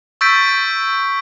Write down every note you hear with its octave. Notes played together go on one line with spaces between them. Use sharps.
C#6 E6 G6 A6 B6 D7